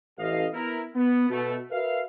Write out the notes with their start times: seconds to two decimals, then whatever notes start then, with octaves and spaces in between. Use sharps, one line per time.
0.18 A1 D#5 F5
0.53 B3 E4 A#4
0.95 B3
1.30 B2 A3
1.71 F#4 A#4 B4 E5 F5